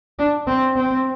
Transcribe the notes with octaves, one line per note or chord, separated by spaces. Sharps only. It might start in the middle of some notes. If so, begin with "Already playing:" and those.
D4
C4
C4